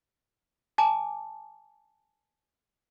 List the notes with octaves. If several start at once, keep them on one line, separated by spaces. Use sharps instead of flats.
G#5 A5 D6